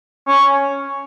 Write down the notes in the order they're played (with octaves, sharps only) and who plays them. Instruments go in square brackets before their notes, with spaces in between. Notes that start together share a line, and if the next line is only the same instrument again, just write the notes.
[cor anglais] C#4